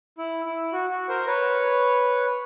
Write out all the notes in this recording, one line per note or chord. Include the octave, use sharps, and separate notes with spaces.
E4
E4
F#4
F#4
A#4 C5
B4 C#5